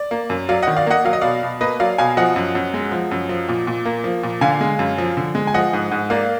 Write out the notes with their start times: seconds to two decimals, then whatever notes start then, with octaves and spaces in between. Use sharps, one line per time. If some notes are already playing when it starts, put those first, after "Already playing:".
Already playing: D5
0.11 A#3
0.30 F#2
0.49 F#3 D5 F5
0.62 D#3 D#5 F#5
0.77 D5 F5
0.87 A#3 D#5 F#5
1.04 F#3 F5
1.13 D#5
1.21 B2 D5 F5
1.43 B2
1.61 A#3 B4 D#5
1.80 F#3 D5 F5
1.98 B2 F5 G#5
2.17 F3 D#5 F#5
2.36 F#2
2.55 F#2
2.74 G#3
2.92 F3
3.11 F#2
3.29 F3
3.48 A#2
3.67 A#2
3.85 A#3
4.04 F3
4.23 A#2
4.41 D3 F5 G#5
4.61 G#3
4.79 F#2
4.98 F3
5.17 D3
5.35 G#3
5.47 G#5
5.54 F3 D#5 F#5
5.73 G#2
5.91 G#2
6.10 A#3 D5 F5